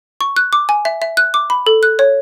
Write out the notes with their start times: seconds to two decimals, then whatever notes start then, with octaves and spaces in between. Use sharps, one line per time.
0.21 C#6
0.37 F#6
0.53 D6
0.69 G#5
0.85 E5
1.02 E5
1.17 F#6
1.34 D6
1.50 B5
1.67 A4
1.83 F#6
1.99 C#5